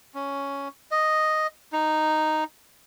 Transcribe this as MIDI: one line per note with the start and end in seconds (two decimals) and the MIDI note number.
0.15 0.68 61
0.91 1.47 75
1.72 2.44 63